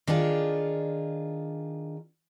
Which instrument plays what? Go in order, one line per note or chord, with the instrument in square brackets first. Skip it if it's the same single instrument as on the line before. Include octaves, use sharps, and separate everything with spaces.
[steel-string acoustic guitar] D#3 D4 F4 G#4